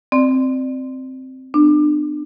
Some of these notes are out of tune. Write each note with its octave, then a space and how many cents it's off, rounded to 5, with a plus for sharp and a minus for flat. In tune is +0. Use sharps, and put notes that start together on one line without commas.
C4 +0 D5 +20
B3 +35 D4 +30